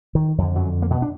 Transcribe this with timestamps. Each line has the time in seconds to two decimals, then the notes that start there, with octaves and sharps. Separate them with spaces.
0.15 D#3
0.38 F2 D3
0.55 F#2 F#3
0.82 A#3
0.91 B2 B3
1.02 D4